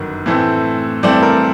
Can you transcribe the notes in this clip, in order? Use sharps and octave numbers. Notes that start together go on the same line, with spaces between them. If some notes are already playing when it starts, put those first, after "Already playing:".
Already playing: G1 F#2 D#3
A2 E3 A3 C4
G2 E3 A3 C4 D5
A#4